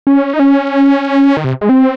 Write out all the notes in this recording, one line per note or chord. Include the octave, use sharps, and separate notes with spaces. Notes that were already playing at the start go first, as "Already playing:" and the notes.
C#4
D#4
C#4
D#3
C3
G#3
C4